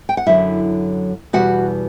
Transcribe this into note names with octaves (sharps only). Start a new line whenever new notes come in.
G5
F#5
F#2 D3 F#3 E4 E5
E2 B2 G3 F#4 F#5